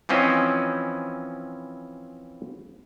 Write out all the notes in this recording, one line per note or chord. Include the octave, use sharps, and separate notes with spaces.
E3 F3 C4 C#4 E4 D#5